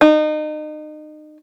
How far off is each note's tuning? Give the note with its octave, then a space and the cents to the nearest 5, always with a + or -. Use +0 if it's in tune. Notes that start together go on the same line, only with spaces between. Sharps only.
D#4 -30